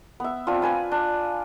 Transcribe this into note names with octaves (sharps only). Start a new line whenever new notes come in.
B3 E5
C4 D4 F4
B4 G#5 B5
D4